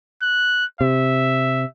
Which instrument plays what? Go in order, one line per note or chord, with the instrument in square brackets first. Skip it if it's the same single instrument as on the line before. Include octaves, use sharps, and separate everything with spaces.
[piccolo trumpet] F#6
[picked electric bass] C3 [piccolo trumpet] E5